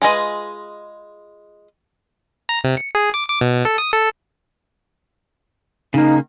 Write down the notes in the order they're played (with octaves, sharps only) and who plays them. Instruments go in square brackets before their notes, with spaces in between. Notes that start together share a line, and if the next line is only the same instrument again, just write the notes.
[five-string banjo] G#3 F4 G#4 B4 D#5
[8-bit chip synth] A#5
C3
C#7
G#4
D6
D6
B2
A4
D#6
A4
[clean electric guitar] C#3 A#3 [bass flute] D#4